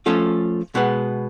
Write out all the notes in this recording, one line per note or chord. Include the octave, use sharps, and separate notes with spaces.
F3 A3 C#4 F4 A4
B2 G#3 B3